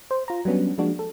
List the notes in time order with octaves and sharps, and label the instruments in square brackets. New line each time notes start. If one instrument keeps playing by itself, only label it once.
[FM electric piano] C5
F4 A#5
F#3 G3 B3 C#4 D4
F3 G#3 A#3 D4 F#4
A4